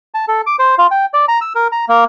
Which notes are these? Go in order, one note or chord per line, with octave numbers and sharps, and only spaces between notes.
A5
A4
D6
C5
F4
G5
D5
A#5
E6
A#4
A#5
A#3